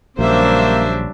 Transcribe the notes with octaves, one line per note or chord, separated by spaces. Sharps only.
A#1 C#3 F#3 G3 A#3 D4 C5 E5